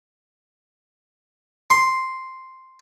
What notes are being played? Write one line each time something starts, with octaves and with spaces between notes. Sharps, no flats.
C6